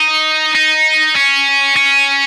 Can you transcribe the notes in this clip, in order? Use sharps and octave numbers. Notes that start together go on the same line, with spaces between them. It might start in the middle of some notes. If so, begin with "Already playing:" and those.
Already playing: D#4
D#4
C#4
C#4